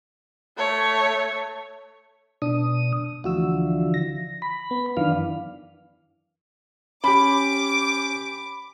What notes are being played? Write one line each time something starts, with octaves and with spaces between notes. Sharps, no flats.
A3 C#5
B2 D4 D#6
D2 D3 E3 F3 F#4 E6
A#6
B5
B3
F#2 D#3 E3 D4 F5
C#4 G4 B5 D6